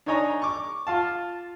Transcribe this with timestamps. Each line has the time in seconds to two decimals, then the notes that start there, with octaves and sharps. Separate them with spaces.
0.06 D4 D#4 C#5 D#5 G#5 A#5
0.42 C#6 D6
0.87 F4 F5 A5